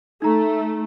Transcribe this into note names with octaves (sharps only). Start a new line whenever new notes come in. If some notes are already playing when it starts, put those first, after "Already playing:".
A3 D#4 A#5